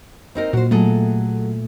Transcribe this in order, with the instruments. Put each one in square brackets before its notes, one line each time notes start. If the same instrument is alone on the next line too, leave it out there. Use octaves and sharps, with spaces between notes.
[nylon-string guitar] C4 D#4 A#4
[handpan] A#2 [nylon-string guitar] F#4 C5
[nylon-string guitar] F#3 G#4 A4 [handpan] A3